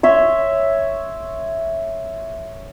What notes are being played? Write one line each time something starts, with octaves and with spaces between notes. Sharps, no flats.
C#5 E5 C6